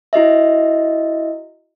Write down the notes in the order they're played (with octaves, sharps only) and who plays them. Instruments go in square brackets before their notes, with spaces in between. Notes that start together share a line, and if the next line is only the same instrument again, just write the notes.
[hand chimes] E4 F#4 D#5 E5